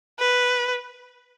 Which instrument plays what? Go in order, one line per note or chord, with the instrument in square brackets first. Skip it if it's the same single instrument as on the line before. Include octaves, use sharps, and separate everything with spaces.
[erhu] B4